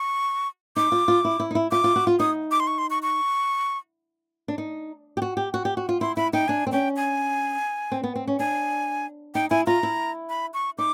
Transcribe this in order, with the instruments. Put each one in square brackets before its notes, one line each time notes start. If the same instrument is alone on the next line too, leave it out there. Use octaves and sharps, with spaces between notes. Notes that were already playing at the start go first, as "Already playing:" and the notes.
Already playing: [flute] C#6
[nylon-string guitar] D#4 [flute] D6
[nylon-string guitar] F4
F4
E4
E4
D#4
E4
[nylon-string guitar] F4 [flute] D6
[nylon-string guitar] F4
F#4
F4
[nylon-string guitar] D#4 [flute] D#6
[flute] D6
C6
C#6
C6
C#6
C#6
[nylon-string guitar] D4
D#4
G4
F#4
G4
F#4
G4
F#4
F4
[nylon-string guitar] E4 [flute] C6
[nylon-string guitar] E4 [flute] B5
[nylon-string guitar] D#4 [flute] G5
[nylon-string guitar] D4 [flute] G#5
[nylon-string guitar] C4
[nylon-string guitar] C#4 [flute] G5
[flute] G#5
[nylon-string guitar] C4
B3
C4
C#4
[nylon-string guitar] D4 [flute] G#5
[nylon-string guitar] D#4 [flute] G5
[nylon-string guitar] E4 [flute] G#5
[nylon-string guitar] F4 [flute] A#5
[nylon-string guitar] E4
[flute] B5
C#6
[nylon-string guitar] D#4 [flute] D6